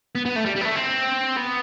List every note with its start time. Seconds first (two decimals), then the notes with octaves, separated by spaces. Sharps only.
0.15 B3
0.26 B3
0.36 A3
0.46 G3
0.56 G3
0.61 B3
0.65 A3
0.76 C4
1.36 B3